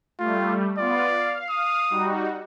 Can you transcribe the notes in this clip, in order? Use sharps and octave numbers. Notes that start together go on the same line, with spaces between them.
G3 A3 F4
B3 F4 D5
F5
D#6
G3 D#4 F#4